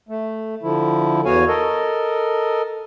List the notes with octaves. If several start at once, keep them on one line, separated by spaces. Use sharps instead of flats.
A3
D3 F3 E4
E2 B3 F#4 C#5 F5 G#5
A4 A#4 D#5